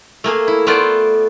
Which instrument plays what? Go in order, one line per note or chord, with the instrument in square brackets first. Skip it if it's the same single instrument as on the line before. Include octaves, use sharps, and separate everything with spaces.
[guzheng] A3 A#3 G#4
E4
A3 B3 F4 C5 D5